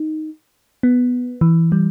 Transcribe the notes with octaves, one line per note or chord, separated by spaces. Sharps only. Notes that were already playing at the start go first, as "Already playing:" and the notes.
Already playing: D#4
B3
E3
G3